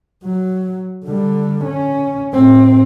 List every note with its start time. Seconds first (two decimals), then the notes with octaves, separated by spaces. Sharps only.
0.24 F#3
1.05 D3 G3
1.64 C#4
2.33 A2 C4